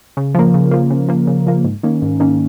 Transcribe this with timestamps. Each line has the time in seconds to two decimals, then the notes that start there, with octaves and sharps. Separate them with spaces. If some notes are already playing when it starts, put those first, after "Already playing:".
0.17 C#3
0.35 F3 A#3
0.54 C#3
0.71 F3 A#3
0.90 C#3
1.08 F3 A#3
1.27 C#3
1.47 F3 A#3
1.64 G#2
1.83 D#3 A#3 C#4
2.02 G#2
2.20 D#3 A#3 C#4